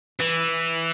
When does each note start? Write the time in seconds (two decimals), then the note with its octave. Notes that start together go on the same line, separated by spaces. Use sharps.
0.20 E3